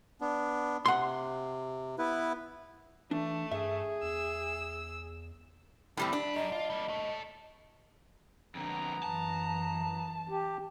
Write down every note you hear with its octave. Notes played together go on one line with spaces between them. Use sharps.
B3 D4
C3 F#5 C6
B3 E4 B4
E3 A3 D4
G2 G#4 E5
E2 E6
D#2 A2 G3 C4
D4 B4
F#2 D#5
F4
G3 A#3
A4 C#5
F2 D3 B3 A#5
F#2 E3 A5
G4